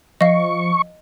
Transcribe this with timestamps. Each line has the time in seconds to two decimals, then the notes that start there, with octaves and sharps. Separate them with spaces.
0.21 F3 D#5 F5 C#6